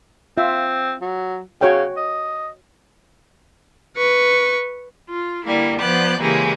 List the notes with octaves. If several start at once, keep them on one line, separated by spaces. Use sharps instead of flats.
C4 F4 E5
F#3
C#3 F#4 C#5 G5
D#5
B4 C#6
F4
D3 G3 A#3 E4
F3 B3 D5 F#6 G6
C#3 E3 G#3 A#3 E4 G4